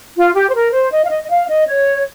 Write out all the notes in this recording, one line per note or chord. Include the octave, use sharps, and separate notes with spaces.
F4
G4
C5
A#4
C5
D#5
F5
D#5
D#5
F5
D#5
C#5